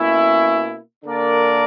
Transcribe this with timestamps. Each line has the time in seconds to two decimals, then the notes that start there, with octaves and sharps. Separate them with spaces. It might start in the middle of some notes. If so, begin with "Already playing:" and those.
Already playing: B2 A#3 C#4 E4
1.03 D3 A#3 D4 A#4 D5